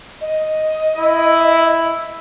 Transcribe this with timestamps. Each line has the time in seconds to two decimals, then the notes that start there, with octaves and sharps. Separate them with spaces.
0.21 D#5
0.97 E4